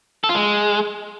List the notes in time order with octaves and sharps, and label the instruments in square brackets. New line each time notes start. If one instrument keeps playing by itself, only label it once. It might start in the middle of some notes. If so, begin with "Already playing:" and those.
[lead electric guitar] A4
F4
G#3